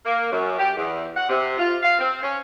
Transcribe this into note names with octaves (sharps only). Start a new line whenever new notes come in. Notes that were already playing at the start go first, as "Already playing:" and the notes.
A#3
F#2
G4
E2
F#5
C3
F4
F5
C4
C#4